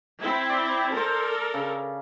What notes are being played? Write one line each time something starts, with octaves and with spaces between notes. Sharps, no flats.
C4 E4
D5
A4 A#4 C5 A5
C#3